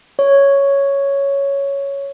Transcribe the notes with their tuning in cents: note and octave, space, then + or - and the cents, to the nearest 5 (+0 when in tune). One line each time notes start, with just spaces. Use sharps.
C#5 +5